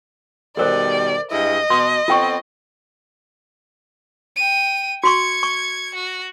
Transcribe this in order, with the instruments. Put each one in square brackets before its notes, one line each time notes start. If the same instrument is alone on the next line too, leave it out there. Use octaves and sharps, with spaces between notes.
[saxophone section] B2 D#3 G3 [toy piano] A4 A#4 C5 [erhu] D5
[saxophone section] G2 G#3 E4 [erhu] D#5
[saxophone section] B2 [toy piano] C6 D#6
[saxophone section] B3 C4 A4 [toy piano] F4 G5 C#6
[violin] G5 D#7
[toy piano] F#4 C6 C#6 [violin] G#6 C#7
[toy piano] C#6
[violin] F#4